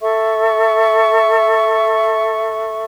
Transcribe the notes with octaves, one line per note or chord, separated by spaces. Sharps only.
A4 E5 C#6